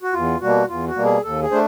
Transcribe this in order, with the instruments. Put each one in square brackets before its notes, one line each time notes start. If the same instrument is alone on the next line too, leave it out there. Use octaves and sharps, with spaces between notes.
[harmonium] F#4
E2 F4
B2 G3 A#3 F#4
E2 F4
F#4
B2 G3 A#3
G#4
D#2 A4
G#4
A3 D4 C5